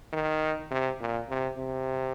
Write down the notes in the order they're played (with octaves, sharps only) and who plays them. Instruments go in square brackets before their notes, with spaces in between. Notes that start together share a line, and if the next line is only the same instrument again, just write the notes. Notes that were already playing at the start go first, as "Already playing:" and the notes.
[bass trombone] D#3
C3
A#2
C3
C3